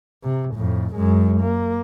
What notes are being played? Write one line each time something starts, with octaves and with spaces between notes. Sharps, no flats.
C3
F2 A2
F#2 G#3
A#3